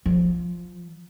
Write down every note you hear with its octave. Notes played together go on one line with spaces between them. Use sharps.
F3